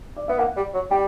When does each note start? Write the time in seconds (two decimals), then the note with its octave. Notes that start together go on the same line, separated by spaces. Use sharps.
0.16 D5
0.28 B3 E5
0.38 A#3 F#5
0.56 G3
0.74 F#3
0.90 G3 G5